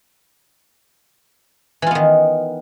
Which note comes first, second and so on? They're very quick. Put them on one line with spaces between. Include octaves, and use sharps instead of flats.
E3 F4 B3 D#3